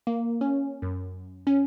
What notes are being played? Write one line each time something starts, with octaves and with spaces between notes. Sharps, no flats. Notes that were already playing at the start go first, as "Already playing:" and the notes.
A#3
C#4
F#2
C#4